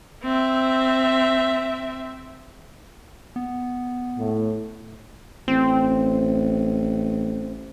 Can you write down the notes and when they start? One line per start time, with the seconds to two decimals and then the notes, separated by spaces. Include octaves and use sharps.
0.24 C4 E5
3.36 B3
4.17 A2
5.48 A1 C4